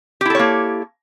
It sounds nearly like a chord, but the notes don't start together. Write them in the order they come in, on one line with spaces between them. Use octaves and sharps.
G4 E4 A4 C#5 A#3